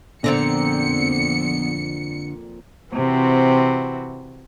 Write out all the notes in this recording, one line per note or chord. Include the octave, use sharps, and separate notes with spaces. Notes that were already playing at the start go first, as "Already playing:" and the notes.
F2 A#2 D3 B3 C4 A#5 C#7
C3 E3 C4 F#4